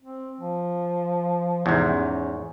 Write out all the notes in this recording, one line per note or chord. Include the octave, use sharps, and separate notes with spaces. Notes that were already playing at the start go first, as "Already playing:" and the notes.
C4
F3
E2 G#2 C3
C#4